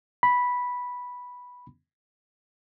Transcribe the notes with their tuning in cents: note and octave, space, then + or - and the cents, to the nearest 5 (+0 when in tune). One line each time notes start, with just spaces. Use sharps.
B5 -5